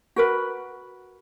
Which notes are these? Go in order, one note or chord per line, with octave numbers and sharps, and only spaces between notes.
F#4 A#4 B4